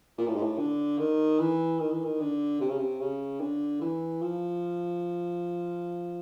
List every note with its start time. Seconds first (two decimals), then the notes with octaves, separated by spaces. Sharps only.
0.18 A#2
0.27 A2
0.35 G#2
0.42 A2
0.58 D3
0.98 D#3
1.39 E3
1.80 D#3
1.91 E3
2.04 D#3
2.20 D3
2.60 C3
2.69 C#3
2.78 C3
2.99 C#3
3.40 D3
3.81 E3
4.21 F3